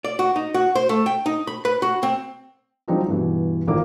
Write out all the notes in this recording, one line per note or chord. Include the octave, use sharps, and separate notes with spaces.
D5
F#4
D#4
F#4
C5
A3
G5
D#4
B5
B4
F#4
C4
F#3 G3 C4 D4 D#4 F4
G2 B2 E3
G#1 A#2 A#3 D6